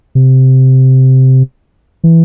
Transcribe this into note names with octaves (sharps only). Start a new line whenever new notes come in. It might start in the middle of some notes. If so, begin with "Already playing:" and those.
C3
E3